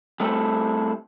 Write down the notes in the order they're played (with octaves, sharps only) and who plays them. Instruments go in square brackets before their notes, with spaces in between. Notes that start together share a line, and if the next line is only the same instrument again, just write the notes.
[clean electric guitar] G3 A3 C4 E4 G4 A4